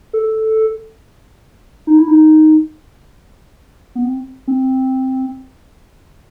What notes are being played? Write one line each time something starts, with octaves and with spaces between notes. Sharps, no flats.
A4
D#4
E4
D#4
B3
C4
C4